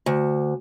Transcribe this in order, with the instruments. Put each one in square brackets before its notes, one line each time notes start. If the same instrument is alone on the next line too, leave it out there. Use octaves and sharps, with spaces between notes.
[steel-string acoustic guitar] D2